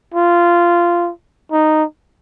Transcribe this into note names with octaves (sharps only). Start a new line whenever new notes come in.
F4
D#4